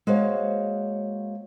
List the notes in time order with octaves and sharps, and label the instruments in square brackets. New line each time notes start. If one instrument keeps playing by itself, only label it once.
[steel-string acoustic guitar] G#3 A#3 F#4 C5 C#5 F5